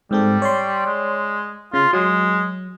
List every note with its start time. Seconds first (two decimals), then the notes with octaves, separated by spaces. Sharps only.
0.11 G#2 G3 C4 A4
0.42 C#5 D5 C6
0.86 G#3
1.74 C#3 F4
1.93 F#3 G#3